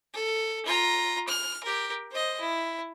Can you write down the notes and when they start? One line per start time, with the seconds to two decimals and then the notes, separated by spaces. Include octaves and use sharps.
0.14 A4
0.66 F4 A#5
1.28 F6
1.63 G4 A#4
2.11 C5 D#5
2.40 E4